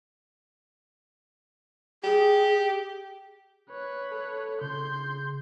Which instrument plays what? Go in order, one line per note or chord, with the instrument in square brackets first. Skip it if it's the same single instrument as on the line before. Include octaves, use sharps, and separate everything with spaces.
[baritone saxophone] G4 [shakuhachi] G#4
[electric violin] B4 C#5
[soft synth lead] A4
[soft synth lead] C#3 [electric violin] C6 G6